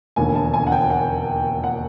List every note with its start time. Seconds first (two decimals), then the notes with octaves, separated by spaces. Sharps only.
0.16 E1 D#2 D3 G#5
0.35 A5
0.54 G#5
0.67 F#5
0.72 G5
0.90 F#5
1.64 F#5